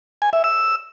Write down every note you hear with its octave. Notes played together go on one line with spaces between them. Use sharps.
G#5
E5
E6